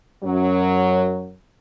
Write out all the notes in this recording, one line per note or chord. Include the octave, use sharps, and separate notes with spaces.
F#2 F#3